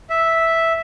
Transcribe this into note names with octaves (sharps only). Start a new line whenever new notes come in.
E5